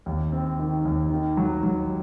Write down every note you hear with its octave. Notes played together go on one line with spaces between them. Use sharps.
D#2
C4
D#3
D#2
D#3
F#3
F#3